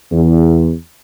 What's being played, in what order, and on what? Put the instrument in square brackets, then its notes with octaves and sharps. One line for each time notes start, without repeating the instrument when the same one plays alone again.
[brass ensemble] E2